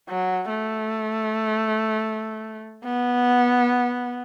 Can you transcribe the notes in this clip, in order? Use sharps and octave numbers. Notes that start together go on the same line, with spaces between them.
F#3
A3
B3